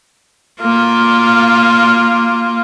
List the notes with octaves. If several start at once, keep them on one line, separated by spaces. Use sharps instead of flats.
A#3 F4